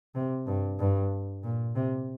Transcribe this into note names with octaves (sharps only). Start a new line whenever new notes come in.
C3
G2
G2
A#2
C3